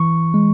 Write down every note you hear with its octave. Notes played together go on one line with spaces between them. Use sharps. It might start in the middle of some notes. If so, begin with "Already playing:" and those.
Already playing: E3 C#6
G#3